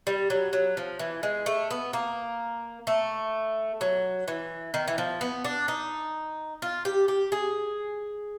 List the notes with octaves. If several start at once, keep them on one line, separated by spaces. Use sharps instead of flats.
G3
F#3
F#3
F3
E3
G#3
A3
B3
A#3
A3
F#3
E3
D#3
E3
F3
B3
D4
D#4
F4
G4
G4
G#4